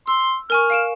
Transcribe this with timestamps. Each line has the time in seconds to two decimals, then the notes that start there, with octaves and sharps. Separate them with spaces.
0.07 C6 E6
0.50 A#4 G#5 C#6 F6
0.70 F5 D7 E7